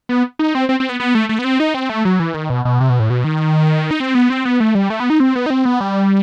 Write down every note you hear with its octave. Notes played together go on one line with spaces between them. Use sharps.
B3
D#4
C4
C4
C4
B3
B3
A3
A3
B3
C4
D#4
C4
A3
F#3
E3
D#3
B2
B2
C3
B2
A2
B2
D#3
D#4
C4
B3
C4
B3
A3
G3
A3
B3
D#4
C4
B3
D#4
C4
B3
G3